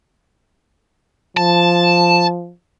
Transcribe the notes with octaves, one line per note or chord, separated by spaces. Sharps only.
F3 A5